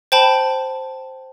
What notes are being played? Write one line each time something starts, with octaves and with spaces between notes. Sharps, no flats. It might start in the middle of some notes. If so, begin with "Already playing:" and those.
C5 G5 A5 B5